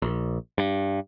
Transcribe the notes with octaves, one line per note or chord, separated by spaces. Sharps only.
A#1
G2